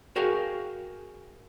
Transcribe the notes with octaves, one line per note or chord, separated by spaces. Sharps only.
F#4 G#4 A#4 F5 G5